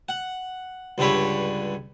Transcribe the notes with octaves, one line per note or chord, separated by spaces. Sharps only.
F#5
C#2 G2 D3 B4 C#5